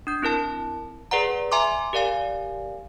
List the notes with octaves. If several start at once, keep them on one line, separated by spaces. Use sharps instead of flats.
D4 G6
C4 E4 A#4 A5
G#4 B4 D5 F#5 A#5
E5 G#5 A#5 C6 D6
G4 A#4 D5 F5 G#5